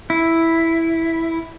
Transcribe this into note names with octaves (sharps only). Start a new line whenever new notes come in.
E4